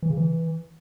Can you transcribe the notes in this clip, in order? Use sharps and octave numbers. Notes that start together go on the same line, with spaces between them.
E3
C#3
E3